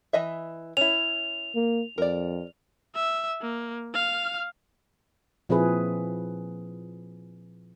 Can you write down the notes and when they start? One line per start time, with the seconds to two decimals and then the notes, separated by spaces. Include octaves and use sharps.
0.13 E3 D#5 E5
0.77 C#4 E4 F7
1.55 A#3
1.98 F2 A#4 D5
2.95 E5
3.41 A#3
3.94 F5 F6
5.49 A#2 F3 C4 E4 G#4 B4